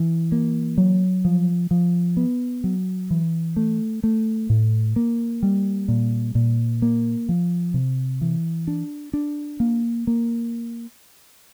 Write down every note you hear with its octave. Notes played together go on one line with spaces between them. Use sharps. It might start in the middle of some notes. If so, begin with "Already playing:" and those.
Already playing: E3
A#3
F#3
F3
F3
B3
F#3
E3
A3
A3
A2
A#3
G3
A#2
A#2
A#3
F3
C3
E3
D4
D4
A#3
A#3